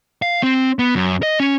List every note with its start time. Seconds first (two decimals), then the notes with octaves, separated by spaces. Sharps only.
0.22 F5
0.43 C4
0.79 B3
0.95 F#2
1.23 D#5
1.40 C#4